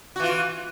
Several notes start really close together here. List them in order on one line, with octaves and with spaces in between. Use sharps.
F#4 E3 F4